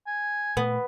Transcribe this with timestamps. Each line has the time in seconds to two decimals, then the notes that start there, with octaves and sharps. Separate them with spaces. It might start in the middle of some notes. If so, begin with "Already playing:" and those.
0.07 G#5
0.57 A#2 A3 B3